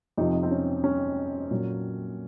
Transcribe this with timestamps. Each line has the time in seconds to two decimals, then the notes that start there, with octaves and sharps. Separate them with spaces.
0.18 F2 C3 F3 D#4
0.43 C4
0.51 C#4
0.84 C#4
1.51 A#2 F#3